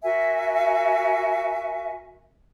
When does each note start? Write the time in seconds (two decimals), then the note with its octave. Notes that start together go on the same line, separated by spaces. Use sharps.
0.03 F#4 A#4 E5 G#5